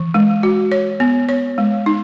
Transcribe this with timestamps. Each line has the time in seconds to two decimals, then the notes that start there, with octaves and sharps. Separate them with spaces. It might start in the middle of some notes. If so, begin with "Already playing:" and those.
Already playing: E3
0.14 G#3
0.43 F#4
0.72 C#5
1.00 B3
1.29 C#5
1.58 G#3
1.86 D#4